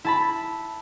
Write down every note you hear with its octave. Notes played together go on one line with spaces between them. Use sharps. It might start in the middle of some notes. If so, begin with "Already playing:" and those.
E4 A5 B5